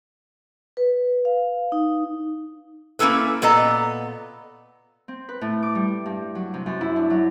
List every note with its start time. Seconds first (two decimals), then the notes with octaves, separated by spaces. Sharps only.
0.77 B4
1.25 F5
1.72 D#4
2.99 A#3 C#4 E4 A4 B4
3.42 A#2 B3 A4 D#5 A#5
5.08 C4
5.29 B4
5.41 A2
5.63 D6
5.75 G3
6.06 G2
6.35 F#3
6.54 C3
6.66 F#2
6.81 E4
6.96 D4
7.10 F#3